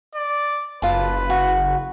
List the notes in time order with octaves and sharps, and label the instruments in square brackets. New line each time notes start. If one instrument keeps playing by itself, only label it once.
[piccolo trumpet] D5
[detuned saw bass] F#1 [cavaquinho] F4 A5 [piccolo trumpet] B4
[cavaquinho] F#4